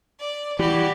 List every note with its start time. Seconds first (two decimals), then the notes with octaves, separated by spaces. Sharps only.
0.20 D5
0.59 E3 G3 F#4 G4